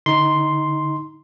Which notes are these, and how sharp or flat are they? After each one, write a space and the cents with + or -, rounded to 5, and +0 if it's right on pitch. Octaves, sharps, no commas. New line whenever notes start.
D3 +0 D#4 +25 C6 +0